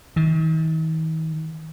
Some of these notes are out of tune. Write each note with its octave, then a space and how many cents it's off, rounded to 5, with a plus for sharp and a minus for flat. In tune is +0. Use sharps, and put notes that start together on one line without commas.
D#3 +45